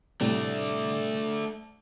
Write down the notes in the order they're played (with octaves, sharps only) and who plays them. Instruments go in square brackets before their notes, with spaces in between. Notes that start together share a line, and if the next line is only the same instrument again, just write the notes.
[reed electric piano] A2 C3 G3 [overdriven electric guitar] A3 D4